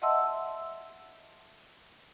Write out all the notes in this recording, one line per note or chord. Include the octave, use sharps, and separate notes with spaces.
D#5 E5 F#5 A5 C6 E6